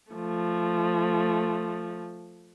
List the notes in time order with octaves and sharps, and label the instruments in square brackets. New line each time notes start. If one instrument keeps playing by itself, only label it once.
[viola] F3 A3